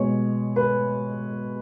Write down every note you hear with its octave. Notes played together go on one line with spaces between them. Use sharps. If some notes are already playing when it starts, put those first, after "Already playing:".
Already playing: B2 G#3 C#5
B4